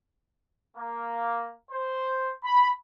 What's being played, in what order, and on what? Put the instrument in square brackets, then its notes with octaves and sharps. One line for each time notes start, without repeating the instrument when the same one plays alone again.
[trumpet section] A#3
C5
B5